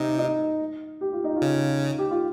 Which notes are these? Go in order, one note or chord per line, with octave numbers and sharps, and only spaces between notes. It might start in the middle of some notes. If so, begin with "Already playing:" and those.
Already playing: C3 D#4
D#4
G4
F4
D#4
F4
C#3
G4
F4